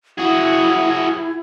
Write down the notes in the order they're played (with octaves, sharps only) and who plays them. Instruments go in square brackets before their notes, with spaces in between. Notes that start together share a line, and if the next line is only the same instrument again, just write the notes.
[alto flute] E4 [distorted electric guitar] F#4 G#4